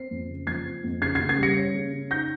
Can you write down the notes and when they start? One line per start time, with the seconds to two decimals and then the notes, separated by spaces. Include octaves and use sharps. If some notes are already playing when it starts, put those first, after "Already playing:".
Already playing: C4 C7
0.11 F2
0.29 C#3
0.47 F3 G#6 C7
0.66 C4
0.84 F2
1.02 C#3 G#6 C7
1.15 C#3 G#6 C7
1.29 G#6 C7
1.38 G3 A#6 C#7
1.57 C#4
1.75 C#3
1.93 C#3
2.11 D#4 G6 A#6